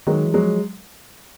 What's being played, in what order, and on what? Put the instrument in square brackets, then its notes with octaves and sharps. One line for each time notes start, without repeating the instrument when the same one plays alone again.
[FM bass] D#3 [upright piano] F#3 G#3
[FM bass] E3
[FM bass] F3 [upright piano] F#3 G#3